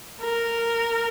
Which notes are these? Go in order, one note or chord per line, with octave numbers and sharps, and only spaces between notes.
A#4